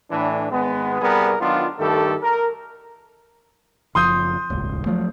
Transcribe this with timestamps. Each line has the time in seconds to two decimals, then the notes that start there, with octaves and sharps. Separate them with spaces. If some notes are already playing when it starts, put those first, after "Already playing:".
0.10 A2 E3 D4
0.51 G#1 G#3 B3
1.01 C2 G3 B3 G#4 A#4 B4
1.40 D#3 F#3 B3 D4 F4
1.79 G2 D#3 A3 G4 A4
2.23 A#4
3.95 F#1 F3 C6 D#6 G6
4.50 D#1 G#1 C#2
4.86 F3 F#3 A3